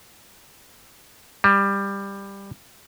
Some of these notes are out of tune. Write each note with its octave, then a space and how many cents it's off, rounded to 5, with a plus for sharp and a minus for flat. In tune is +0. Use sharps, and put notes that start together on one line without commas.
G3 +15